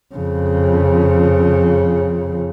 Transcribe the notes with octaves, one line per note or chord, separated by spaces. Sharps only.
F2 C#3